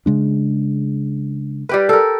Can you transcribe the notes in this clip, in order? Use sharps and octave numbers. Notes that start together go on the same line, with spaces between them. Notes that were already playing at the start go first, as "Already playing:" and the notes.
C#3 G#3 D4
G3 G4 B4
A4 A#4